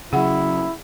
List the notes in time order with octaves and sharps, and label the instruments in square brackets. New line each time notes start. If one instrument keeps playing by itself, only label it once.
[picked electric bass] C#3 F#3 [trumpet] E4 [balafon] G#4 F#5